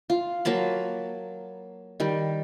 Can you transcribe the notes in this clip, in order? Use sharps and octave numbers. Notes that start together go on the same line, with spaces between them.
F4
F#3 A#3 A5 B5
D#3 G3